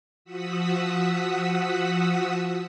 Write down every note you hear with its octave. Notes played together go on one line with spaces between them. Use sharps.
F3 F#4 F#5 D#6 E6 B6